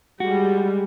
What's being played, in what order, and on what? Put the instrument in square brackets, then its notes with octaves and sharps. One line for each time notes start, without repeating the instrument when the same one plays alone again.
[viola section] G3 G#3 [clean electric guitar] F#4